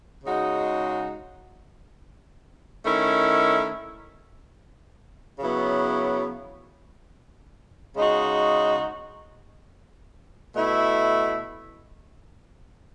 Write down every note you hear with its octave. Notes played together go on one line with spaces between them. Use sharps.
C#3 G#3 D#4 F#4
D#3 A3 C#4 E4
C#3 F#3 B3 E4
C#3 G#3 D#4 F#4
B2 A3 E4